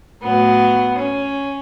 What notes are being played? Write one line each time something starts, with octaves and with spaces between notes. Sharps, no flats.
A2 F#3 B3
C#4